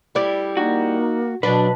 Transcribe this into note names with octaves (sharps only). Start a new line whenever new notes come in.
G3 E4 D5
A#3 D#4 F#4
B2 F#3 D4 B4